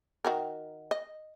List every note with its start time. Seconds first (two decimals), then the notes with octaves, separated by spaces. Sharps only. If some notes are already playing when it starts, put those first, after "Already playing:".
0.25 D#3 F#4 A#4
0.91 D#5